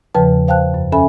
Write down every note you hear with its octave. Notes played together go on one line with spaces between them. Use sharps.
E2 C#3 F3 B4 G5 A5
C5 F5 G5 A5 F#6
F#2
C#4 A4 E5 G#5 B5